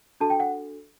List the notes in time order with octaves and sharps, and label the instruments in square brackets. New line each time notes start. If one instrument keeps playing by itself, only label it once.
[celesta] D4 F#4 A4 A5
G5
F#5